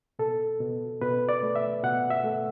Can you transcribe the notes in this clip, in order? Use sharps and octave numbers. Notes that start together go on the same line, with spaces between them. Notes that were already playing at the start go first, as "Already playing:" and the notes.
B2 A4
B2
B2 B4
D5
A3
E5
B2 F#5
E5
A3